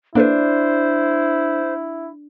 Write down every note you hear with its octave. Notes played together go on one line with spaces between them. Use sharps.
A#3 D4 E4 A4 B4 C5